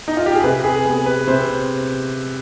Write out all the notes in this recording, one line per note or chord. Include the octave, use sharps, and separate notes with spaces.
D#4
F4
G4
G#4
C3 B4
G#4
B3 G#4
B4
C3 C5